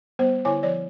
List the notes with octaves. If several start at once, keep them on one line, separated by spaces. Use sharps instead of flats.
G3 B3 C5
D3 E4 C#5 G#5 D6
F3 C#5 D5